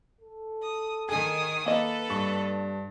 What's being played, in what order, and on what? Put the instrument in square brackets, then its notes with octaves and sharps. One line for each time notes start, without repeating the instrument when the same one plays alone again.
[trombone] A4
[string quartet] D#6
[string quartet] D#3 G#5 D#6 [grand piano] G#4
[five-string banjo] A#3 D#5 [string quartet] A4 B4
[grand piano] G2 C#6 [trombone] D4